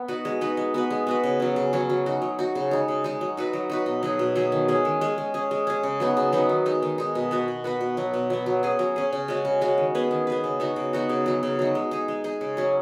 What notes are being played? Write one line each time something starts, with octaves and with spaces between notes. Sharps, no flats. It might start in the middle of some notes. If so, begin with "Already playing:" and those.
Already playing: B3
D#4 F#4 B4
G#3
D#4 F#4 B4
G#3
B3 F#4 B4
G#3
B3 F#4 B4
C#3
F#3 C#4
C#3
F#3 C#4
F#3
D#4 F#4
F#3
D#4 F#4
C#3
G#3 D#4
C#3
G#3 D#4
F#3
D#4 F#4 B4
F#3
D#4 F#4 B4
B2
F#3 D#4 G#4
B2
F#3 D#4 G#4
D#3
G#3 C#4 G#4
D#3
G#3 C#4 G#4
G#3
C#4 G#4
G#3
C#4 G#4
C#3
F#3 B3 D#4
C#3
F#3 B3 D#4
D#3
G#3 D#4
D#3
G#3 D#4
B2
B3 F#4 B4
B2
B3 F#4 B4
B2
F#3 B3
B2
F#3 B3
F#3
C#4 G#4
F#3
C#4 G#4
C#3
G#3 C#4 F#4
C#3
G#3 C#4 F#4
D#3
B3 G#4 B4
D#3
B3 G#4 B4
C#3
B3 D#4 F#4
C#3
B3 D#4 F#4
C#3
F#3 D#4
C#3
F#3 D#4
G#3
D#4 G#4
G#3
D#4 G#4
C#3
F#3 C#4